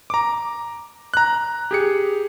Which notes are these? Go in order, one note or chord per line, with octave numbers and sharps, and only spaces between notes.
A#5 D6
A#5 F#6
G4 G#4 C#7